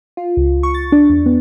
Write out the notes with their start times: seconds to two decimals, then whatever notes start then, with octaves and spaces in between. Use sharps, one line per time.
0.17 F4
0.37 C#2
0.63 C#6
0.74 A6
0.92 D4
1.10 E2
1.26 B3